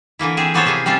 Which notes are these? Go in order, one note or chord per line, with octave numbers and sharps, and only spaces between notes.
D3 E3 A#3 E4
C4 G#4 E5
F3 A#3 B3 A4 C5 C#5
C3 A#3 E4 G#4
G3 C4 C#4 F4 A4